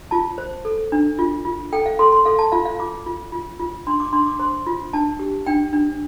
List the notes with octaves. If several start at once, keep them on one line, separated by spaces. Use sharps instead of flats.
F4 A5
C5
A4
D4
F4
F4
A4 G5
F5
A4 C6
C6
A4 F5
A5
F4 F5
F5
F4 D6
F4
F4
F4
D4 C6
D6
D4 C6
D6
C5 C6
F4
D4 A5
G4
D4 G5
D4